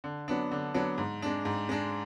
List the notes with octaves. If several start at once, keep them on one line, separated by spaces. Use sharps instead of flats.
D3
F#3 B3 D4
D3
F#3 B3 D4
G#2
G#3 D4
G#2
G#3 D4